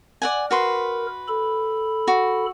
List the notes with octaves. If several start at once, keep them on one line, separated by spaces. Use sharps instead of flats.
D5 F#5 G#5
F#4 A#4 B4 C6
A4 B5
F#4